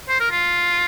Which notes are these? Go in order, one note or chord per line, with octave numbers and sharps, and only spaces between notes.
C5
A#4
F4